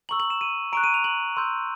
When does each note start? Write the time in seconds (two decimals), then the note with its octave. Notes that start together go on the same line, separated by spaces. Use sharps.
0.09 A#5 C#6 E6 F#7
0.20 F#7
0.30 E7
0.41 D#7
0.73 A#5 C#6 F#6 D7
0.84 D#7
0.94 F7
1.04 F#7
1.37 C6 E6 G6